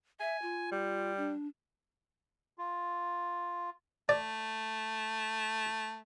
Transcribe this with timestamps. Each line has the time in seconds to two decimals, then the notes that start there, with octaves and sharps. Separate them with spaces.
0.20 E5 G#5
0.42 F4
0.71 G3
1.17 D4
2.58 F4
4.09 A3 D5